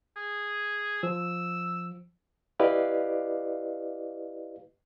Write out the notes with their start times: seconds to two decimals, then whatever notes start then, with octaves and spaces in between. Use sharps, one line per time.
0.16 G#4
1.03 F3 E6
2.59 E4 G4 B4 D5 D#5 F5